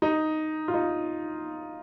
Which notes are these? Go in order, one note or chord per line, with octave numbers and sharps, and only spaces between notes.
D#4
F4
D#4